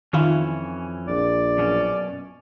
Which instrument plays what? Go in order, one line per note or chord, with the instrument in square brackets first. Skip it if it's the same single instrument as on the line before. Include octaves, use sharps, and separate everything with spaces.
[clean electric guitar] F2 E3 C#4 [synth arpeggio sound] D#3 E4 F4
[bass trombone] A#1 [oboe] D5
[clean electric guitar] F#2 B2 C#4